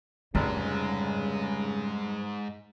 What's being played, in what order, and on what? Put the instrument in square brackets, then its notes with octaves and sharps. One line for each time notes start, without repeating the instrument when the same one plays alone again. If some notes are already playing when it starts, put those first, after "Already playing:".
[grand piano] F1 [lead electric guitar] G#2 G#3 [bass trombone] C#3 [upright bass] G3